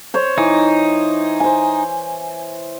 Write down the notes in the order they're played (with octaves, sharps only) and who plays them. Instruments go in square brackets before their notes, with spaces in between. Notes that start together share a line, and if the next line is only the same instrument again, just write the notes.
[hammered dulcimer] C5 C#5
[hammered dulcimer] E3 [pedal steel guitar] D#4
[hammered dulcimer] C5 G#5